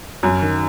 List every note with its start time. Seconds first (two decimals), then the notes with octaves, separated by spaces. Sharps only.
0.23 F#2 F#3
0.42 D#3